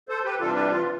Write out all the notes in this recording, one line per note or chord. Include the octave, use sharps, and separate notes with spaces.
A4 C5
G4 B4
C3 E3 G3 D4 F4 A4
G4 B4
F4